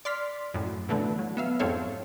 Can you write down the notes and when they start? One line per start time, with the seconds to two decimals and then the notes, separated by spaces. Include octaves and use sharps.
0.05 D5 C6 F6 B6
0.54 F#2 A2
0.89 B2 D3 E3 A3
1.19 F#3
1.37 B3 E5 F5
1.59 F2 G#2 C4 A4 C#5 F5